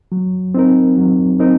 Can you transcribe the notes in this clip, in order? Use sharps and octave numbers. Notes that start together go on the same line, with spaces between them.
F#3
C4 D#4 A#4
F#3
C4 D#4 A#4